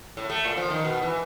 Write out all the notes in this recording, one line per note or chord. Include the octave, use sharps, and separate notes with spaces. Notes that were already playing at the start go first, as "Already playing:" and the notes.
A2
A3
A#2
F3
D#3
B2
E3